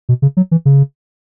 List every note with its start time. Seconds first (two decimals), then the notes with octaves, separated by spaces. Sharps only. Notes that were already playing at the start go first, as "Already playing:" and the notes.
0.09 B2
0.22 C#3
0.37 F#3
0.51 E3
0.65 C#3